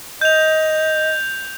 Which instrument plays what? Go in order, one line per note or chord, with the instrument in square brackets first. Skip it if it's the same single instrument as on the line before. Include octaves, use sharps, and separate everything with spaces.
[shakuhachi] D#5 [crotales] G6 F7